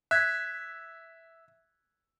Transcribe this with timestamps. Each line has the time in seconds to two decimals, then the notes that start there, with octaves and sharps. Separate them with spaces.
0.11 E5 F#6 G#6 B6